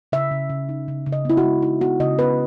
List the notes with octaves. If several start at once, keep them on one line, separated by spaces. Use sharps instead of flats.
C#3 E5
C#3
C#3
D#4
C#3
C#3
D#5
B3 E4
F#4
G#3
D#4 E4
B3 F#4
C#3 D#5
B3 B4